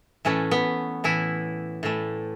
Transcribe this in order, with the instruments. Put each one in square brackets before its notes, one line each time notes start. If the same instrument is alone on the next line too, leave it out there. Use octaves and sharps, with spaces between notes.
[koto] A2 E3 A3 C#4
B3
A2 E3 A3 E4
A2 E3 A3